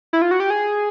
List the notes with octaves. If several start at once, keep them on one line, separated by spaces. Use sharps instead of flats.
E4
F4
F#4
G4
G#4